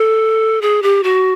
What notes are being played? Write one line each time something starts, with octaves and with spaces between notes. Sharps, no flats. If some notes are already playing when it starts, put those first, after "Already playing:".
Already playing: A4
G#4
G4
F#4